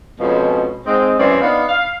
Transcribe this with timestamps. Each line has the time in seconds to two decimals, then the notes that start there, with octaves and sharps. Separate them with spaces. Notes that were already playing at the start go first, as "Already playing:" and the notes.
0.19 F2 B2 F3 G#3 C#4
0.86 G#2 G#3 C4
1.19 F#2 E3 C4 C#4 C#5 D5
1.41 B3 D4 D#4 F5
1.69 F5